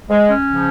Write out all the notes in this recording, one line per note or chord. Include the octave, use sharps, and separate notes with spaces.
G#3
C#4
C#3 F3